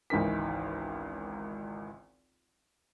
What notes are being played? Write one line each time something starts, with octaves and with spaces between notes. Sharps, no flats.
G#1 C#2 E3 D#4 A#4 B6